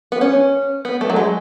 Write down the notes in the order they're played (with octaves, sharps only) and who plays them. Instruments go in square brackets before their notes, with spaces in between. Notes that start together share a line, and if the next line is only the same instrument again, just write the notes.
[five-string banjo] B3
C#4
B3
A3
F#3
G#3